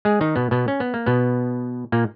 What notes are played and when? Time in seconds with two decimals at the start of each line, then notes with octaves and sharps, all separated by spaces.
0.05 G#3 G#4
0.21 D#3 D#4
0.36 B2 B3
0.51 B2 B3
0.68 C#4
0.80 B3
0.94 A#3
1.06 B2 B3
1.92 A#2 A#3